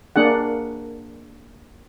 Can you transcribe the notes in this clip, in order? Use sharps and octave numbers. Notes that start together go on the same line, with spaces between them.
A#3 D4 G#4 F#5